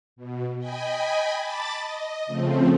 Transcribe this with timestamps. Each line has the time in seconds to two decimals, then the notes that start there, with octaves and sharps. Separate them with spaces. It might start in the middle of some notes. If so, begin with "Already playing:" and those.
0.16 B2
0.58 D#5 G5 G#5 B5
1.39 A5 B5 D6 A6
1.72 D#5
2.26 C#3 F3 A3 C4